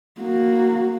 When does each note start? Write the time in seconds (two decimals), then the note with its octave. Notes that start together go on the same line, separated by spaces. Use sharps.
0.21 A#3 F#4